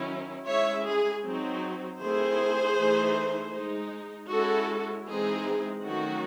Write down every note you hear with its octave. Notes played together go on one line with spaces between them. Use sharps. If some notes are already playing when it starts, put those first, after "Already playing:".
Already playing: D#3 F#3 C#4 E4
G#3 C#4 E4 C#5 E5
G#4
F#3 C4 D#4
D#3 A3 C4 E4 G#4 C5
E3 A3 D#4
G#3 D#4
G#3 C#4 E4 F#4 A4
E3 G#3 C4 D#4 G#4
D#3 F#3 A3 C#4 F#4